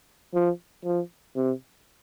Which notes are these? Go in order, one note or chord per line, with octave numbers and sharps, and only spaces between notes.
F3
F3
C3